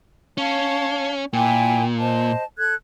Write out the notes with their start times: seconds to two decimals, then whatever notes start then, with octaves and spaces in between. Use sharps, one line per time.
0.38 C#4 C#5 F5 A5
1.33 A#2 E4 G5 G#5
1.98 C5 D#5 A5
2.58 A4 F#6 G#6